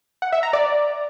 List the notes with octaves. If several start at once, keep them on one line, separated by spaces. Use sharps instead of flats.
F#5
E5
A#5
D5